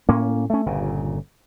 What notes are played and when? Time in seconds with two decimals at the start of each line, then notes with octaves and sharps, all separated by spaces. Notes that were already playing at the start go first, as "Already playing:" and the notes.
0.09 A2 A#3 C#4
0.50 A3 C#4
0.66 G1 A#2 C#3